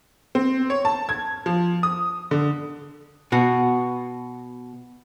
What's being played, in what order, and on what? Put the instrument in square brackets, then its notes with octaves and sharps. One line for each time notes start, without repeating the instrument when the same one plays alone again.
[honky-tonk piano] C4
C#5
A5
G#6
F3
D#6
D3
[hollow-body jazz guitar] B2 F#4